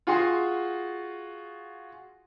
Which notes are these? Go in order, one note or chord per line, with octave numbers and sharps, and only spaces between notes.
F4 F#4 G#4 C6